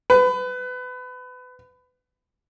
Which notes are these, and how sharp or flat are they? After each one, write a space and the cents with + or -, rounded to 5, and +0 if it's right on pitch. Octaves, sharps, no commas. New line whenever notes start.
B4 +25